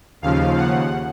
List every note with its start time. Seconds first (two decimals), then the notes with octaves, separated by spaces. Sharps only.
0.22 D#2 C#3 F3 F5
0.57 F#5